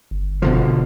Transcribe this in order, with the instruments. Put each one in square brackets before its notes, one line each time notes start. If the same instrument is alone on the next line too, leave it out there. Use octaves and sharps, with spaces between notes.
[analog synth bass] G1
[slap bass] B2 D3 F3